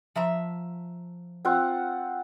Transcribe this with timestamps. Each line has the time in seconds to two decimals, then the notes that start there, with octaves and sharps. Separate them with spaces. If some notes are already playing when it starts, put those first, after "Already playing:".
0.16 F3 E5 A#5
1.45 C4 F4 F#5